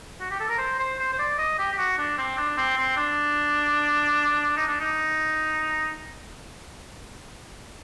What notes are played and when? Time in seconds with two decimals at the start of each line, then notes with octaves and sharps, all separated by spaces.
0.20 F#4
0.31 G4
0.40 A4
0.49 A#4
0.58 C5
0.79 C5
0.99 C5
1.13 C5
1.19 D5
1.38 D#5
1.59 G4
1.73 G4
1.79 F#4
1.98 D4
2.18 C4
2.38 D4
2.57 C4
2.77 C4
2.97 D4
4.57 D#4
4.68 D4
4.81 D#4